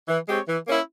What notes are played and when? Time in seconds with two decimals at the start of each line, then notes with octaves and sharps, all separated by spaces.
0.08 E3
0.28 G#3 C4 G4 C#5
0.48 E3
0.67 A#3 C#4 E4